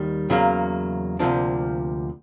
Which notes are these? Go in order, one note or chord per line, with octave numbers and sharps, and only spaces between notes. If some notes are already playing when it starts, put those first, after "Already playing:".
Already playing: D#2 D#3 G3
E2 C#3 F#3 A#3
D2 C3 F3 A#3 D4